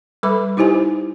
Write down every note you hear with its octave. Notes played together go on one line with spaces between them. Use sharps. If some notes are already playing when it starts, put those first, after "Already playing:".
G3 A4 B4 B5 D6
D#4 E4 G4 C5 G#5